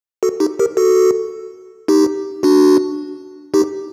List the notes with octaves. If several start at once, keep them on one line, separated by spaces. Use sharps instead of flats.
F#4 A4
D#4 G4
G4 A#4
F#4 A4
D#4 G4
D4 F#4
D#4 G4